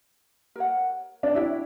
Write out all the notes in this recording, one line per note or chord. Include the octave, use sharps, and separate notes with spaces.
A#4 C#5 F#5
D4
E4 F#4 C#5 E5 G5